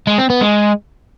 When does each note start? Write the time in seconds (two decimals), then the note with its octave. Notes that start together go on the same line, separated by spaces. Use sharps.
0.07 G#3
0.18 C4
0.30 B3
0.41 G#3